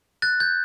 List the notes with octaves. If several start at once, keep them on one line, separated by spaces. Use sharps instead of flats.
F#6 A6
G6